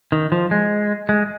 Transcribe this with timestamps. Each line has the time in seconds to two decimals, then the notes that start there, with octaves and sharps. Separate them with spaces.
0.12 D#3
0.32 F3
0.51 G#3
1.09 G#3